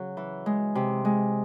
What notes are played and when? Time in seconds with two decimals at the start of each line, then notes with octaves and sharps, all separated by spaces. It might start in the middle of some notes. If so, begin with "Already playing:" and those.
Already playing: C#3 F#3
0.17 E3
0.46 G#3
0.75 C3
1.05 G#3